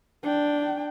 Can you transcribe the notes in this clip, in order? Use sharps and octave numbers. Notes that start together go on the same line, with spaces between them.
D4 G5